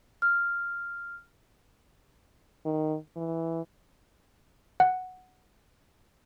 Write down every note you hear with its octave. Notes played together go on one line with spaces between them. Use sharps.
F6
D#3
E3
F#5